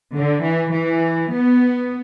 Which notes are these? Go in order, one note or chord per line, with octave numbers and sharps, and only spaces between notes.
D3
E3
E3
B3